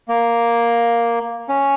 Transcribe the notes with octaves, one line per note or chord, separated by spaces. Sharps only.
A#3
C#4